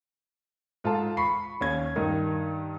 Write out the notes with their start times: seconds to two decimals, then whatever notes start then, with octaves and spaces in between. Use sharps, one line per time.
0.84 G#2 F4 A4 A5
1.17 B5 C#6 C7
1.61 D#2 C#4 G#6
1.96 G2 D#3 D#4 A#4